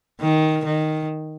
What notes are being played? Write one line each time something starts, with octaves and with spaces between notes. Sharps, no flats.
D#3
D#3